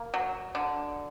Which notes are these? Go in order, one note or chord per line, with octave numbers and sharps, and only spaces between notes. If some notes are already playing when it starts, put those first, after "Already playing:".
Already playing: A#3
F#3
D3